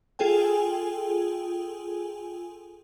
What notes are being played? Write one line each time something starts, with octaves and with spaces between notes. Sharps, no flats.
F4 G#4 A4 G5 G#5